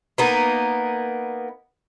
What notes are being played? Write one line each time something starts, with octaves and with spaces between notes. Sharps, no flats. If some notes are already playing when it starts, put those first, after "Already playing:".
A#3 B3 D#4